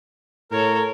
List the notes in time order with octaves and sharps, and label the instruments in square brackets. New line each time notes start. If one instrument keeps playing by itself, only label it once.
[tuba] A2 [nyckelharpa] A4 C#5 [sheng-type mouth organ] A#4